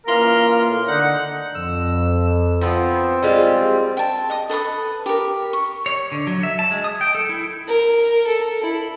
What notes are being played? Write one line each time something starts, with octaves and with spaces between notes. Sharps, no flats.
E3 A#3 C#4 F4 A#4
A2
D3 D#4 F#5
F2 E6
F3 B3 C4
G3 G#3 F4
G5 A5
D#5 D#6
A4 B4 A#5 D#6
G4 A#4
C#6
C#5
D3
F#3
E5
A5
G#3
D#6
G5
A4
E4
A#4
A4
E4